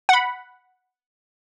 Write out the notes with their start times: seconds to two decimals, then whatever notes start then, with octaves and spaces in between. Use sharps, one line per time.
0.09 F#5 B5